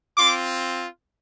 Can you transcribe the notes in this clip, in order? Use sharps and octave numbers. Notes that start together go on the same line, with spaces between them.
C4 F4 C6 D6